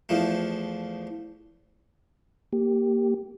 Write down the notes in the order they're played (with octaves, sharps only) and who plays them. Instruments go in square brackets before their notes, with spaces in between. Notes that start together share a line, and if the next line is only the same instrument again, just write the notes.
[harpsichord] E2 F3 A3
[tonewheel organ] A#3 G4